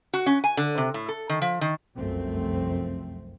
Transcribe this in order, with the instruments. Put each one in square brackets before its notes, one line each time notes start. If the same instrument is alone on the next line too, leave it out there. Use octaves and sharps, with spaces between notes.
[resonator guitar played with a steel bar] F#4
C#4
G#5
D3
C3
A2
A4
D#3
F3
D#3
[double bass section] F1 C2 F#2 F3 A3 C4